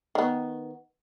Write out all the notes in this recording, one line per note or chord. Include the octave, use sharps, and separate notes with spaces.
D#3 B3